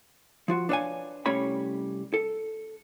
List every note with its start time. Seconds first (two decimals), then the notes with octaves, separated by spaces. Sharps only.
0.48 F3 F4 F#4
0.69 D4 B4 C#5 E5 F5 G#5
1.26 C2 G3 A3 C#4 C#5 B5
2.14 A4